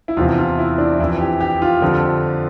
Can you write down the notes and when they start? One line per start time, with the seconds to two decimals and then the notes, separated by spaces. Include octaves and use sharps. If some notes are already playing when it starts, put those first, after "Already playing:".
0.08 E4
0.17 E2 C3 F3 F4
0.38 F4
0.59 E4
0.78 D4
0.99 F2 E4
1.03 E3
1.20 G4
1.41 G4
1.62 F4
1.82 F2 D3 F3